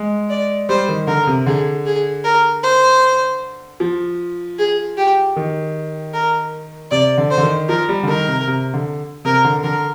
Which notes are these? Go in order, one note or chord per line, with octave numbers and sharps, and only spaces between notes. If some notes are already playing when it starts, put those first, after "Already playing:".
Already playing: G#3
D5
G3 C5
D#3
D3 A#4
C3
D3 G#4
G#4
A#4
C5
F3
G#4
G4
D#3
A#4
C3 D5
D3
C5
D3
D#3
F3 A#4
G3
D3
D#3 A#4
C3
C3
D3
C3 A#4
D3
D3 A#4